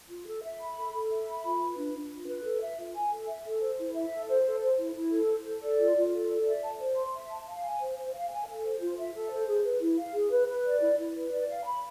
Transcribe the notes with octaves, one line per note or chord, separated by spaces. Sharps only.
F4
A4
E5
B5
A4
A4
E5
B5
F4
B4
D4
D4
F4
B4
A4
E5
F4
G#5
A4
E5
A4
C5
E4
E5
A4
C5
A4
C5
E4
E4
A4
C5
A4
D5
F4
F4
A4
D5
E5
A5
C5
C6
E5
A5
F5
G#5
C5
C5
F5
G#5
A4
C5
F4
E5
A4
C5
G#4
B4
E4
F5
G#4
B4
B4
D5
E4
E4
B4
D5
F5
B5